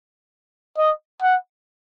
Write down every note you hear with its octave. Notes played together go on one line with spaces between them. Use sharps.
D#5
F#5